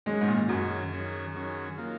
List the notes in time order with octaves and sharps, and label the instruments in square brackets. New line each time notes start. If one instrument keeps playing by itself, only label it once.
[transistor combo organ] D#3 F#3 C#4 G#4 [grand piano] G#3
[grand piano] G#2
A#2
[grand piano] F#2 [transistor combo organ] D#3 F#3 C#4 G#4
[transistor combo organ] D#3 F#3 C#4 G#4
D#3 F#3 C#4 G#4
D#3 F#3 A#3 F4